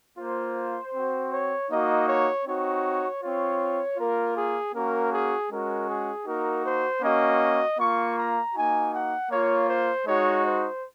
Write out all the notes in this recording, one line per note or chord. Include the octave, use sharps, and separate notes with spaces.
A#3 F4 C5
C4 F#4
C#5
A#3 D#4 F#4 D#5
C#5
C4 D#4 F#4 C#5
C4 F4 C#5
A#3 F4 A#4
G#4
A#3 C#4 F#4 A#4
G#4
G#3 C#4 F#4 A#4
G#4
A#3 D#4 F#4 A#4
C5
A#3 C#4 F#4 D#5
A#3 F4 C#6
A#5
A#3 D#4 F#4 G#5
F#5
A#3 F4 C#5
C5
G#3 D#4 F#4 C#5
C5